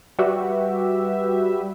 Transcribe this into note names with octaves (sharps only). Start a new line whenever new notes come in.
G3 F#4 G4 B4 E5